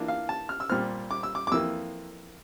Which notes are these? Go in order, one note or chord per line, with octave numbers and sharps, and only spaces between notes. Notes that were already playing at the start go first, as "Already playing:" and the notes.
Already playing: E3 A#3 D4 F4
F5
A5
F6
E6
A#2 G3 C4 F6
D6
E6
D6
D6
F2 E3 A#3 E6